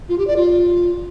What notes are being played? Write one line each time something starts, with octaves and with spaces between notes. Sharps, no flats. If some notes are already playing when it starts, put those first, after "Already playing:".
F4
G4
D5
F4